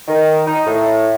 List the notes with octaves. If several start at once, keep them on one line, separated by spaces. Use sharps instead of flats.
D#3
D#4
A2